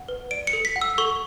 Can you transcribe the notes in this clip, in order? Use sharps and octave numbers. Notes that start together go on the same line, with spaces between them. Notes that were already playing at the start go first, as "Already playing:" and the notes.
Already playing: F#5
B4
D5 D7
C#7
A4
B6
F#5
E6
A4 C#6